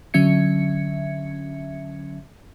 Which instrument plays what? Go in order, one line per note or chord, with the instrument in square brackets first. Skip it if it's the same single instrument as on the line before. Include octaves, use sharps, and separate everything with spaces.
[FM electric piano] D3 F#3 C#4 E5 G#6 C#7